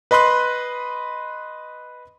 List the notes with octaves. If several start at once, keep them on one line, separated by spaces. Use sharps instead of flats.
B4 D#5 B5 C6 F#6